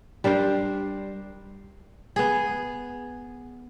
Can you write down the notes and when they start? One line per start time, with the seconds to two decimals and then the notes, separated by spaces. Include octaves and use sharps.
0.24 G3 D4 A#4 C5
2.16 B3 G#4